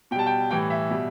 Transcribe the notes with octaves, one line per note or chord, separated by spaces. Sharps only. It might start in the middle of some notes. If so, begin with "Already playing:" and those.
B2 G3 G5 A5
G5
A2 E3 G3 G5
E5
B2 G3